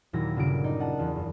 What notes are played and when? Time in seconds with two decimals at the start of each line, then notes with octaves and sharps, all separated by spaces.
0.13 D#2 A#2 F#3 E4 A#6
0.36 G1 C#3 F#4 D7
0.64 D#4 D5 D#5 A#5
0.79 F4 D#5 F#5 A5
0.98 E2 F4
1.16 F#1